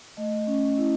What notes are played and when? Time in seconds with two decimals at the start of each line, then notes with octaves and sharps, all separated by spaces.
0.17 A3 D#5
0.47 C#4
0.77 E4